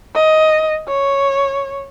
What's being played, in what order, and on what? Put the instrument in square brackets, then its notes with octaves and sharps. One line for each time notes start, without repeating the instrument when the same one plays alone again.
[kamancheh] D#5
C#5